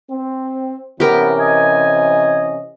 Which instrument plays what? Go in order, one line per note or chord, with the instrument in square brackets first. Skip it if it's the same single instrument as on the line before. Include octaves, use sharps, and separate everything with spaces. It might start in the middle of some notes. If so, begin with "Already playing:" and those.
[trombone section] C4
[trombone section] C3 E3 C#4 [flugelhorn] B3 [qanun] G4 A#4
[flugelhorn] D#5 [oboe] G#5